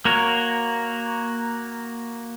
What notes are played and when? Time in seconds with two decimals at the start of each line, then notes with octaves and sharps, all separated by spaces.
0.05 A#3 F#4 A#4 C#5